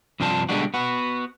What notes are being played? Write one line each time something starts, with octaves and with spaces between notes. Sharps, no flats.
G2 C3 F3 D4 C5 A5
B2 D3 G3 G#3 D4 F#4
B3 F#4